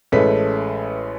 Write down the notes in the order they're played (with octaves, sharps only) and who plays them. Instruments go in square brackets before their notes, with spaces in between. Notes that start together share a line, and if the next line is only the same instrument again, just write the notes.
[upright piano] A1 G#3 A3 C#4 B4 B6